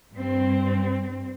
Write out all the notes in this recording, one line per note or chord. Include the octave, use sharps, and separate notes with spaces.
G2 C4